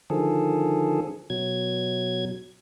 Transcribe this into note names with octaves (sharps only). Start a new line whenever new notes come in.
D3 D#3 F3 G#4 A4
B2 F#3 G#6